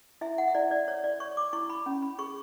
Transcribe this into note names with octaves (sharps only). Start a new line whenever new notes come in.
E4 E5
F#5
E5
E4 D5
D5
C#5
D5
C#5 C#6
D6
E4 C#6
B5
C#4
B5
G#4 C#6